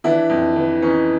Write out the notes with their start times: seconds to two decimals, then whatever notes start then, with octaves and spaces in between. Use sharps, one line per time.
0.04 E3 D4 E4
0.30 F2
0.56 E3
0.82 E3 C#4 D#4